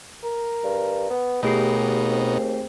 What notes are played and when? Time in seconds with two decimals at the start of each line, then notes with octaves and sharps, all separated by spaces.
0.24 A#4
0.64 G2
1.10 B3
1.43 D#2 B2 A3 D#4 G4 G#4 C7
2.10 C4